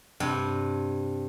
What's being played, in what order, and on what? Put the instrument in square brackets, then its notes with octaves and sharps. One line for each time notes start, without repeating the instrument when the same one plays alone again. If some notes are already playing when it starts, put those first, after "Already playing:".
[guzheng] G2 C3